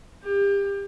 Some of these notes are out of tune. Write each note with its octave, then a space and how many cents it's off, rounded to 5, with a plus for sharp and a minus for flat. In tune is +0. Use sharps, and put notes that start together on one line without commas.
G4 +30